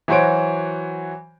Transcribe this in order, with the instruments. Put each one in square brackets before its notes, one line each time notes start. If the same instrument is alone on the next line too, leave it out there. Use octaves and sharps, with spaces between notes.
[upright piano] E3 F#3 F#4 C5 C#5 D7